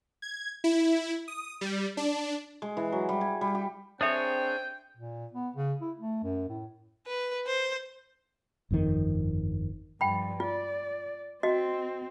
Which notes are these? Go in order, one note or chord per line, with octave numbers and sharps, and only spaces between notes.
G#6
E4
D#6
G3
D4
G#3
E3
F#3
G3
G#5
G3
G4
C4 D4 G#4 A4 C#5 E5 G5
A#2
B3
C#3
E4
A3
F#2
A2
B4
C5
G1 F2 G#2 D#3
G2 F3 G5 B5
F4 D5
C4 F#4 D#5